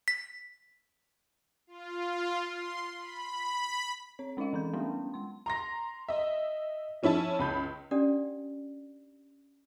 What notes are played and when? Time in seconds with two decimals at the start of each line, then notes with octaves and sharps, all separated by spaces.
0.08 B6
1.67 F4
2.46 C6
2.98 B5
4.19 C4 C#5
4.37 G#3 C#4 D#4 D#5 F5
4.53 E3 C4 C#4 G6
4.73 F#3 G3 A3 B3 C#4 D4
5.14 G#3 C6
5.46 A#5 C6 A#6
6.08 D#5 E5
7.03 F3 C#4 E4 E5 A5
7.39 C#2 B5 G6
7.91 C#4 D4 G4 D5 F#5 D#6